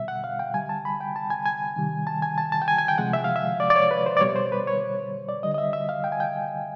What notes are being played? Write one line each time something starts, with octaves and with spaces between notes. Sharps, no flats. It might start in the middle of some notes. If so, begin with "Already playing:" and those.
Already playing: B2 G3 E5
F#5
F5
G5
D3 G3 G#5
A5
B5
G5
A5
G#5
G#5
C3 D#3 G3
A5
G#5
A5
A5
G5
G#5
G#5
G5
C3 F3 G#3 F#5
E5
F5
E5
D5
D5
C#5
B4
C5
D5
B2 G3 C#5
C5
B4
C#5
D5
D3 G3 D#5
D#5
E5
E5
F5
G5
G#5
G5